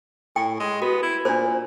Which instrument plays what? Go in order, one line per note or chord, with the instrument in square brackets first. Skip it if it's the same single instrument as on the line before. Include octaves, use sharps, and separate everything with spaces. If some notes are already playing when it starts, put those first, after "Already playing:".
[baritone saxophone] A2 [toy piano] G5
[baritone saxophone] G#3
[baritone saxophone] B3 [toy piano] F#4
[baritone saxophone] E4
[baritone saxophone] A#2 [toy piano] D4 C5